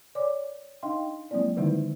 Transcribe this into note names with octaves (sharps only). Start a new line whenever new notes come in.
C#5 D5 D6
D4 D#4 D#5 F5 G5 C6
F#3 G#3 A#3 C4 E4 D5
D3 D#3 G3 G#3 D#4 E4